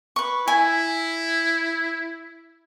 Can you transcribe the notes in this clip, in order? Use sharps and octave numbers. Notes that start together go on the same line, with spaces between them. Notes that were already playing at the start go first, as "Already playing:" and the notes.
B4 C#6
E4 G#5